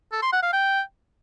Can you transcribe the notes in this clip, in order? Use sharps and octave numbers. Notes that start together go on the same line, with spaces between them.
A4
C6
F#5
F5
G5